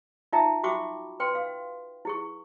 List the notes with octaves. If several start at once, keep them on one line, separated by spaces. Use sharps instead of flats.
D#4 F4 E5 G5 A5 A#5
F#4 E5 G5 B5 C#6 D6
B4 G5 C6
F5
E4 G#4 C#6